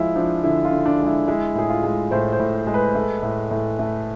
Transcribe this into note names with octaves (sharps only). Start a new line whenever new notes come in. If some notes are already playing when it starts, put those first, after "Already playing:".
Already playing: F3 G#3 E4 F4
F3 D4
D3 E4
F4
D3
D4
G#3
E4
G#3 E4
A2 G#4
F4
G#3
A2 C5
C5
A2
G#3
B4
A3
A2
A2
A3